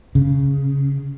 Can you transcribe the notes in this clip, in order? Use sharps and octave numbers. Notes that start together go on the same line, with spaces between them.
C#3